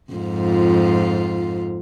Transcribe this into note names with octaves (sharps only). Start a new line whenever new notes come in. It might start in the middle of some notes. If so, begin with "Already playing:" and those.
F2 G#2 F4